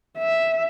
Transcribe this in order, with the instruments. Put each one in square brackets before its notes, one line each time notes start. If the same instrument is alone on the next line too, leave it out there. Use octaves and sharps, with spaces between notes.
[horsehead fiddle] E5